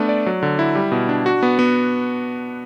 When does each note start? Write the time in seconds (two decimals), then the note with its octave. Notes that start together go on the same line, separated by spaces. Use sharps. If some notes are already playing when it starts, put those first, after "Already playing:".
Already playing: A3 B3 D4
0.09 D5
0.26 F#3
0.43 D3
0.59 E4
0.75 G3
0.92 B2
1.09 D4
1.26 F#4
1.43 B3
1.59 B3